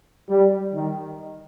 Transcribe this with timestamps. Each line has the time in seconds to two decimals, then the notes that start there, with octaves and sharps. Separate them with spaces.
0.29 G3
0.74 D#3